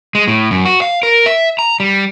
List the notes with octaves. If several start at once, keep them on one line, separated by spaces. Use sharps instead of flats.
G#3
A2
F#2
F#4
F5
A#4
E5
A#5
G3